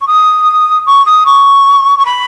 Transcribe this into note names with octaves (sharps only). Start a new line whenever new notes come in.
C#6
D#6
C#6
D#6
C#6
C#6
B5